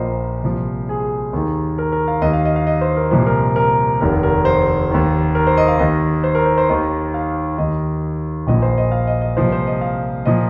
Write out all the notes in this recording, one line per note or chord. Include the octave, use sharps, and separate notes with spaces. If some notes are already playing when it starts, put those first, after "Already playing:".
Already playing: A#1 A#2 F3 A#4 C5 D#5
C2 A#2 F3
G#4
D#2 D#3
A#4
A#4
F5
D#2 D#3 D#5
F5
D#5
F5
D#5
C5
A#4
C2 A#2 F3 C5
A#4
A#4
F1 D#2 D#3 A#4
A#4
C5
D#2 D#3
A#4
C5
D#5
F5
D#2 D#3 D#5
C5
A#4
C5
C5
D#2 D#3 D#5
F5
D#2 D#3 D#5
A#1 A#2 F3 D#5
C5
D#5
F5
D#5
D#5
C2 A#2 F3 C5
C5
D#5
F5
A#2 F3 D#5